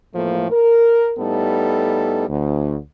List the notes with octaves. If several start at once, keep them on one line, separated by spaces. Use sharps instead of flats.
E2 A2 F3 A3 A#3
A#4
A2 G3 B3 D#4 A4
D2